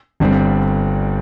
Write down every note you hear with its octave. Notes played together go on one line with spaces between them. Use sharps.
G1 G2 G3 C4